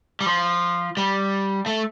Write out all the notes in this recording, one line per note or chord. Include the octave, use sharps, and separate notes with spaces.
G3
F3
G3
A3